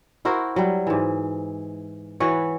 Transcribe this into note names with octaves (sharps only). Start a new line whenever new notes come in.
E4 F#4 A#4 C5
F#3 G3
G#2 E3
E3 F#4 B4 C#5